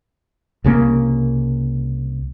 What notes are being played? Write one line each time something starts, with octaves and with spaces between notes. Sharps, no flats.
C2 C#3 E3 A#3